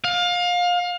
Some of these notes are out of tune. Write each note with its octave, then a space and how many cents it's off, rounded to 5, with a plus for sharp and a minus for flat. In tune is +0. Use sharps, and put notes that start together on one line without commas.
F5 +25